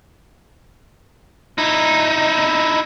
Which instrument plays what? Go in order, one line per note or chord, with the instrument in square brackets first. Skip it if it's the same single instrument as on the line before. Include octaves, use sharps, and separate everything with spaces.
[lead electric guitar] D#4 E4